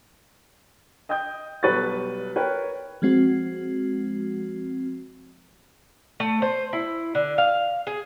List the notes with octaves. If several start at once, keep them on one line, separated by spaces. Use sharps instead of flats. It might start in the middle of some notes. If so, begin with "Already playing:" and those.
D#5 G5 D#6 G6
B1 G3 A4 B4 C#6 A6
A#4 B4 C#5 G5
F3 G#3 C4 F#4
A3
C5
E4
D3
F5
G#4